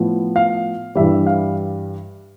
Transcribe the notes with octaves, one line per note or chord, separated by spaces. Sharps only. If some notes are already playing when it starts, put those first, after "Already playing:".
Already playing: A2 F3 B3
F5
G2 E3 G3 E5
F5